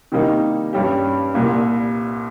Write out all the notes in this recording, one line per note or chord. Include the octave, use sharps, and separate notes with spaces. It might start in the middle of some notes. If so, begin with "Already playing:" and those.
C3 D#3 G3 A#3 D#4
G2 G3 C#4 G4
C2 A#2 G3 A#3